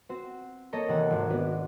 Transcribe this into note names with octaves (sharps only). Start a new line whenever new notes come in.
C4 F#4 C5
A#3 A4 C#5 D#5 A#5
D#2 C3 E3 F#5
G#1 D#3
B3 D4 F#4